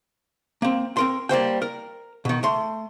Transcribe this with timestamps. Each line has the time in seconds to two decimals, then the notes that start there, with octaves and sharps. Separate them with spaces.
0.62 A#3 C4
0.97 C4 A#4 C6
1.29 G3 A#3 C5 G5
1.62 A#4
2.25 B2 D#3
2.43 A3 C6